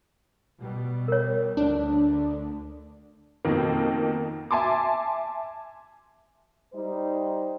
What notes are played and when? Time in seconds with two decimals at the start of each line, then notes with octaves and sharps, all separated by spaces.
0.59 B2 G3
1.08 A#4 C#5
1.57 D2 D3 D4
3.45 F2 B2 D#3 A#3
4.51 E5 G#5 A5 C6 D6
6.74 G3 D#4 C5